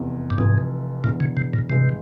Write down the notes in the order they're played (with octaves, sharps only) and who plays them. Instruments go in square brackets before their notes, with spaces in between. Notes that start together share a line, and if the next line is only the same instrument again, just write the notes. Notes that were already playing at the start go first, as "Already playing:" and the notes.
Already playing: [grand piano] F1 E2 C3
[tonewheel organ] G2
[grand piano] F1 F2 E3 [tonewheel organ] G#2
[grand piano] E1 E2 E3 [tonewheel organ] A#2
[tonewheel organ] C#3
C3
A#2
[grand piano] G#1 G2 E3 G#3 [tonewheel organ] C3